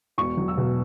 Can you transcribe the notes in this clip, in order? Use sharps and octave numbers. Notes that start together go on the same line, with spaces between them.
E1 C#6
F#3
E6
B2